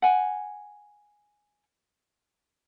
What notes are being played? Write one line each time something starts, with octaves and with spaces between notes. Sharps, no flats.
F#5 G#5